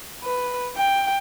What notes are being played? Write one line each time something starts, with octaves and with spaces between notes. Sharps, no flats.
B4
G5